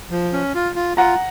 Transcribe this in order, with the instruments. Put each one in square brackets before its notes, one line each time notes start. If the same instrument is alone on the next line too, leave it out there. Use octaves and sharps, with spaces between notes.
[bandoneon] F3
C#4
F4
F4
[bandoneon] F4 [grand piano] F#5 A#5